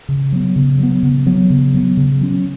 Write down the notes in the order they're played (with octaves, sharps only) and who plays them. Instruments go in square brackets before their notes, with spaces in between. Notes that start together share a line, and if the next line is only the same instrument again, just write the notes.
[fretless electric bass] C#3
F#3 B3
C#3
F#3 B3
C#3
F#3 B3
C#3
F#3 B3
C#3
F#3 C#4